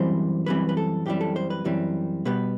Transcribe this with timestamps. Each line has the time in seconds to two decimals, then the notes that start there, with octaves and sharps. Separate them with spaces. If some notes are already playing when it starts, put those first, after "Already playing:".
Already playing: F#2 E3 G3 C4 C5
0.46 F#2 E3 G3 C4 B4
0.69 B4
0.77 A4
1.06 F#2 E3 G3 C4 G4
1.21 A4
1.36 C5
1.50 B4
1.65 F#2 E3 G3 C4
2.25 B2 G3 B3 B4